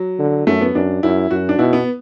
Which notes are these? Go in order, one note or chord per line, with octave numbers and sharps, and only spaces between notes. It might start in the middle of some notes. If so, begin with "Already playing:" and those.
Already playing: F#3
D3
F#2 A3
B3
F#2 D4
F#2 E4
F#2 F#4
D4
B2 E4
B3